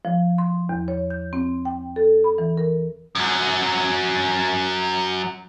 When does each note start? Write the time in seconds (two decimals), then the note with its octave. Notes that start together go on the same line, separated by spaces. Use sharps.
0.05 F3
0.38 C6
0.69 E2
0.88 C#5
1.10 G6
1.33 C4
1.65 G5
1.96 A4
2.24 B5
2.38 E3
2.57 A#4
3.15 F#2 F#3